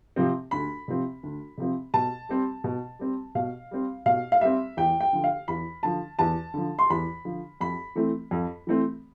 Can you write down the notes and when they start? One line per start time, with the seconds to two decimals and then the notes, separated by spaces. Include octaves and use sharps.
0.16 C3 F3 C4
0.51 D2 B5
0.88 C3 F3 C4
1.23 D2
1.58 C3 F3 C4
1.94 B2 A5
2.29 G3 C4
2.64 B2
2.99 G3 C4
3.35 B2 F5
3.71 G3 C4
4.06 B2 F5
4.32 F5
4.41 G3 C4 E5
4.77 E2 G5
5.00 G5
5.13 D3 F3
5.24 F5
5.48 E2 B5
5.83 D3 F3 A5
6.19 E2 A5
6.54 D3 F3
6.79 C6
6.90 E2 B5
7.25 D3 F3
7.61 F2 B5
7.95 E3 A3 C4
8.31 F2
8.67 E3 A3 C4